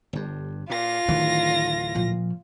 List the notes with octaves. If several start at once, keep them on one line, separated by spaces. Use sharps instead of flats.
G1 G2
A#2 F4 A#6
D1 D#3 E3
A#2 F3